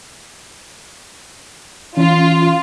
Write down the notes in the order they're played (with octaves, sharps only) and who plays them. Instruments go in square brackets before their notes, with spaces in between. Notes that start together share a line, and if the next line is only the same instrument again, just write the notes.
[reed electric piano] E3 C#4 [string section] F4